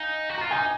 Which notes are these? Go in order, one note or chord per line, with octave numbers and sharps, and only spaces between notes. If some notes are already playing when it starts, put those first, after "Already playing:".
Already playing: D#4 F5 G#5
F#4
F4 A#5
D#4 G#5